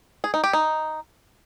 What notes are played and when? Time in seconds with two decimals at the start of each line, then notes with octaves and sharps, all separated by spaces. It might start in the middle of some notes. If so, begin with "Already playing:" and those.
0.24 G#4
0.34 D#4
0.44 G4
0.53 D#4